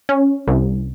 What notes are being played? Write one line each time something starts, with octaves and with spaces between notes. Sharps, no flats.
C#4
C2